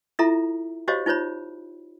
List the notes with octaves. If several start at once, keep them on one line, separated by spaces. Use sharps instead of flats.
E4 F4 A4 E5 A#5
F#4 G4 C5 C#5 D#5 F5
D#4 F4 C5 C#5 B5